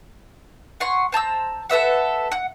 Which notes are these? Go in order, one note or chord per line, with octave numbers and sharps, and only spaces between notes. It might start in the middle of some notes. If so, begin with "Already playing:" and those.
F#5 G#5 C6 C#6
C5 A5 A#5 E6
A4 B4 E5 F#5
F#5